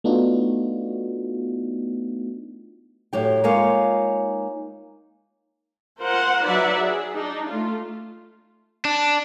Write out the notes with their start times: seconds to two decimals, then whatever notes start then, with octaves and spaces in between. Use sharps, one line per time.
0.04 A3 B3 D4 D#4 F4 F#4
3.13 A2 F#3 G4 G5
3.44 G#3 A#3 D#4 F4 C#5 F5
6.01 F4 A#4 C5 F#5
6.45 F#3 D#4 B4 D5 E5 F#5
6.79 G#4
7.15 D4 D#4
7.48 A3 F4
8.85 D4